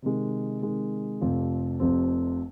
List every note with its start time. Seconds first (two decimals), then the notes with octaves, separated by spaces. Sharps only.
0.02 C3 D#3 G#3
0.62 C3 D#3 G#3
1.21 F1 F2 C3 F3 C4
1.80 F1 F2 C3 F3 C4